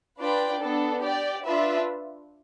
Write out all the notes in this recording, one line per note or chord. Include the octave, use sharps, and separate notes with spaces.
D4 F4 B4 D5 G5
B3 D4 A4
G4 D5 G5
D4 F4 B4 E5